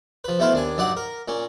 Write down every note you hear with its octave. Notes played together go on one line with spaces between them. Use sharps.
F3 B4
B2 A3 B3 E4 C5 F5
D#2 D4 G#5
G2 F#3 D#4 D5 F#5
A#4
A#2 C#4